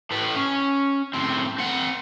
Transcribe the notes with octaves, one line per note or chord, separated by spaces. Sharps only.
A2 B4
C#4
A2 C4
C4 F#5